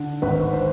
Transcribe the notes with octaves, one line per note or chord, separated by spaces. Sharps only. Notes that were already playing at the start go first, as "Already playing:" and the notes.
Already playing: D3
G#1 B4
C5